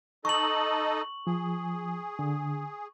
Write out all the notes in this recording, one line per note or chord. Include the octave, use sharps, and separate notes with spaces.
D#4 A4 D#5 C#6 F#7
F3 G#4
D3